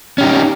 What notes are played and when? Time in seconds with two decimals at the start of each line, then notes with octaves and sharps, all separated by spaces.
0.18 C#4
0.21 G4
0.23 D#4